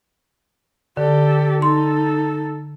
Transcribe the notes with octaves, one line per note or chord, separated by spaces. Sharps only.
D3 G4 A4
D#4 A4 C6